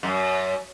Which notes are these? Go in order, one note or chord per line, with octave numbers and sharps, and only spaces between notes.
F#2